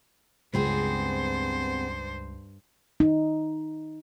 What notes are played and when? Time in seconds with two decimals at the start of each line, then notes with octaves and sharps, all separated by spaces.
0.54 C#2 G2 B3 C4 G#4 C5
3.00 D#4